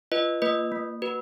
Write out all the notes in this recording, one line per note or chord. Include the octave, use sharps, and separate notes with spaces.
F4 B4 D#5
A#3 B4 D#5
A#3
F#4 B4